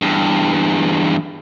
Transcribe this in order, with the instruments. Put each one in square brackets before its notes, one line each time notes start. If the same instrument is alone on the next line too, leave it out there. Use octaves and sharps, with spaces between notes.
[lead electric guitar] E2 G2